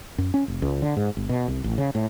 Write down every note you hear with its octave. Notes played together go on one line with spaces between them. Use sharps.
F#2
C#4
F1
C#2
D3
G#2
G1
B2
C2
A1
C#3
A2